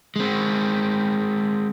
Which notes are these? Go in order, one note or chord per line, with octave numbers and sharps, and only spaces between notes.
G#3 C4